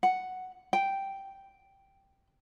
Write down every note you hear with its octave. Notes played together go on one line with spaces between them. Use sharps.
F#5
G5